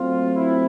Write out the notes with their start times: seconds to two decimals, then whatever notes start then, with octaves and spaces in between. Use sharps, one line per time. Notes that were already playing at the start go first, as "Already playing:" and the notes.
Already playing: F#3 A3 C4 F4
0.35 E4